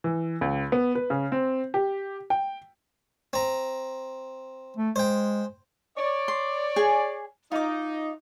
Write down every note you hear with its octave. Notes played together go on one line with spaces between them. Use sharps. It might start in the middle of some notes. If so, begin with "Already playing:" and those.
E3
C#2
B3
B4
C#3
C4
G4
G5
C4 A#5
A3
G#3 C5 G5
C#5 D5
C6
G#4 G#5
D#4 F4 D6